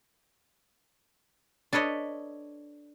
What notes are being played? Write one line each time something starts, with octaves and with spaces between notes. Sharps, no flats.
D4 A4 B4 C#5 D#5